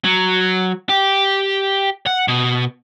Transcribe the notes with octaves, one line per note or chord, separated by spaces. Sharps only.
F#3
G4
F#5
B2